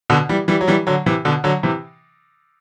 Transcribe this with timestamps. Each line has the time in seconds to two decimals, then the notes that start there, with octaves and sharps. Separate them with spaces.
0.10 B2 D3
0.29 E3 G3
0.48 E3 G3
0.61 F#3
0.68 E3 G3
0.87 D3 F#3
1.06 C3 E3
1.25 B2 D3
1.44 D3 F#3
1.63 C3 E3